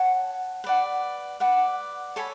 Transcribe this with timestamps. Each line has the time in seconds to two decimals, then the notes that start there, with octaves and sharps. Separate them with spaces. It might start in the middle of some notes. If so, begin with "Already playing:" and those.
Already playing: C#5 F#5 A5 C#6
0.64 B4 D5 F#5
1.40 B4 D5 F#5
2.16 A4 C#5 G#5 B5